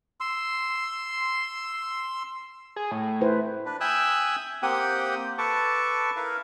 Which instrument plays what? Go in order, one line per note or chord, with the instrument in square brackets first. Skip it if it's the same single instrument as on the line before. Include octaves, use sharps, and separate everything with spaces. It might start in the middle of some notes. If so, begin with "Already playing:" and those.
[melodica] C6 E6
[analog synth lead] G#4
A2
[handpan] E4 B4 C5
[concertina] D4 B4
E5 G5 G#5 D#6 E6 F#6
A#3 C4 G4 F#5 G5 D#6
A4 B4 A5 C#6 D6
E4 A#4 B4 F5